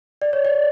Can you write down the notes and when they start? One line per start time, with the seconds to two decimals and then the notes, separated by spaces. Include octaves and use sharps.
0.22 D5
0.33 C#5
0.45 D5